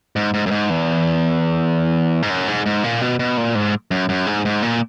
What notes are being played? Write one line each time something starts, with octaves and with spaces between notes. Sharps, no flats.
G#2
G#2
F#2
G#2
E2
G#2
F#2
G#2
G#2
A#2
B2
B2
A#2
G#2
F#2
F#2
G#2
G#2
A#2